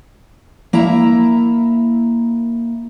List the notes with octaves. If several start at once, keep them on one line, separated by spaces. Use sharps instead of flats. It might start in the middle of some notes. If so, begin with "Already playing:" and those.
A#3 E4 E5 A#5